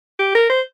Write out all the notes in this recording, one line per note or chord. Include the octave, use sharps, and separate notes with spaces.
G4
A#4
C5